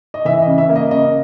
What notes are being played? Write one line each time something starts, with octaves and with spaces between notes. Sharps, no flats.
D#5
E3 E5
D#5
C#3
E5
A#3
D#5
C#3 D#5